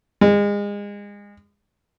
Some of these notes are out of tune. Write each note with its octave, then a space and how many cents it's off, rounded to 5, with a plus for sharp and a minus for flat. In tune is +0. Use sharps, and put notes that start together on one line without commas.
G#3 -30